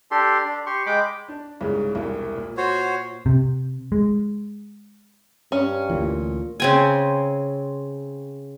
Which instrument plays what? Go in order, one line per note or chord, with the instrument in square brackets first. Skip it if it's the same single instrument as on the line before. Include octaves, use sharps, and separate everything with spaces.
[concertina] D4 G4 A4 C6
D4
G4 C6 C#6
G#3 G5 B5 D6
[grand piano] D4
C2 G#2 C#3
E1 C2
A#2
[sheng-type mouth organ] F#4 C5 C#5
[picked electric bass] C3
G#3
[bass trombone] G2 [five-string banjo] C#4
[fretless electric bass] D2 E3 [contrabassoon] A#2
[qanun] C#3 C4 G#5